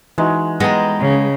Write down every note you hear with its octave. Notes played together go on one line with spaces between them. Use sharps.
E3 G#3 D#4 F#4
G#3 B3 D#5 G5 A#5
C#3